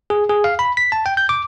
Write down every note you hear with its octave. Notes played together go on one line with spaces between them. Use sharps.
G#4
G#4
F5
B5
B6
A5
G5
G6
D6